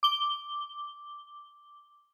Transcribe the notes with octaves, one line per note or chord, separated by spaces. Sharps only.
D6 G7